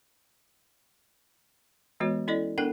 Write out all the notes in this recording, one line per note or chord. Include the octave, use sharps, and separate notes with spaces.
E3 G#3 B3 F#4 C#5
C#4 E4 A4 D5 D#5
B3 D4 A4 A#4 F#5 G5